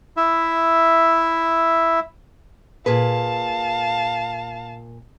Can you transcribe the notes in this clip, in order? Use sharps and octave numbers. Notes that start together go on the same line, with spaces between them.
E4 E5
A#2 G#4 B4 F5 A5